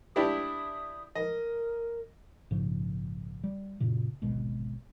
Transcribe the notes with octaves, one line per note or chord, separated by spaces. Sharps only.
D4 E4 G4 D#6
A#4 D#5
A#1 G#2 C#3
G3
F#2 A#2 C#3
D1 G#1 B2 G#3